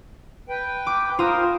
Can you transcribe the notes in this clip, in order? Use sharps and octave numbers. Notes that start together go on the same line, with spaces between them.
B4 G5
D6
F4 A#4 C5 D#6